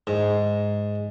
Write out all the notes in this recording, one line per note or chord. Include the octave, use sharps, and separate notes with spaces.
G#2